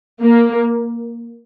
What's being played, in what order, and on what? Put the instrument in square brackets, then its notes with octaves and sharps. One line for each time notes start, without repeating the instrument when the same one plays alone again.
[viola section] A#3